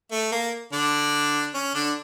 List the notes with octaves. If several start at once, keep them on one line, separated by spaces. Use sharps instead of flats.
A3
A#3
D3 D4
C#4
D3 D4